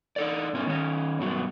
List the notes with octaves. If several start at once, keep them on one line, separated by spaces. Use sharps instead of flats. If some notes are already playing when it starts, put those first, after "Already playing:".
D#4 A4 D5
G#2 B2 C#4
D#3 C#4
G2 B2 F#3